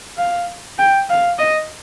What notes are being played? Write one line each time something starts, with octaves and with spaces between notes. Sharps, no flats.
F5
G5
F5
D#5